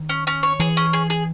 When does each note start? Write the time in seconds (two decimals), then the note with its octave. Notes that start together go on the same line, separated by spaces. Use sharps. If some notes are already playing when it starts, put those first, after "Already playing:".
Already playing: D#3
0.09 C#4
0.27 C#4
0.43 C#5
0.60 E3 G#4
0.77 C#4
0.93 G#4
1.10 G#4